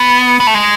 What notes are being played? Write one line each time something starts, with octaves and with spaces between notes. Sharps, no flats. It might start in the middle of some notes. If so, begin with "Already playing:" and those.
Already playing: B3
B3
A3
G#3